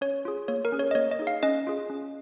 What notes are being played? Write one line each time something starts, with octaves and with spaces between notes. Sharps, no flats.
C#4 C#5
F4 G#4
A#3 C#5
A#4
C#4 G#4
C#5
D#5
A#3 C#5
D#5
D#4 G#4
F5
C#4 D#5
F4 G#4
C#4